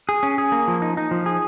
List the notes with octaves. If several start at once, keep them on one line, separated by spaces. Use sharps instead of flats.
G#4
C#4
G#4
A#3
F3
D#4
D#4
F3
G#4